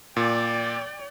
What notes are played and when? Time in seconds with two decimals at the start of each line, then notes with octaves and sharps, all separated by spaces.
0.16 A#2 D5 G5